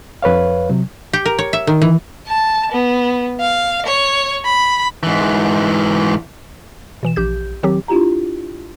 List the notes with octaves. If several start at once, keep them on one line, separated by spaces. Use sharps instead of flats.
F2 B4 C#5 F5
C3 F#3
G4
A#4
C#5
E5
D#3
E3
A5
B3
F5
C#5
B5
G#2 E3
B2 E3 E7
A#1 G4 G6
D#3 F#3 C4 G4
D4 E4 F4 G4 A#5